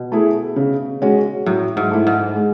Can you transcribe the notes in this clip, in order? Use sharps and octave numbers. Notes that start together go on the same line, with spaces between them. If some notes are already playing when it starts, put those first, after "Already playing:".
Already playing: B2
A3 E4 G#4
C#3
G#3 C#4 F#4
A2 F#3
G#2
A3 E4
G#2
G#3